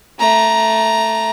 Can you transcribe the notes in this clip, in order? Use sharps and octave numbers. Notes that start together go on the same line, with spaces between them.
A3 A#5